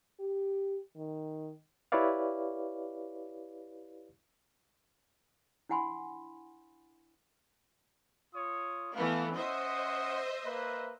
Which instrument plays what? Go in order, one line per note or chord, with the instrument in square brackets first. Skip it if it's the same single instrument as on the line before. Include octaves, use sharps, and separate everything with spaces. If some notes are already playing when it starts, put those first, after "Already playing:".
[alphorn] G4
D#3
[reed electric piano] E4 G4 B4 C#5 D5 F5
[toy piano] D4 E4 F#5 G#5 B5 C6
[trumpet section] F4 C#5 D#6
[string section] E3 A3 B3 [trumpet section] F5
[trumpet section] C#4 F#5 D#6 [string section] C5 D#5 E5
[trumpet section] A#3 B4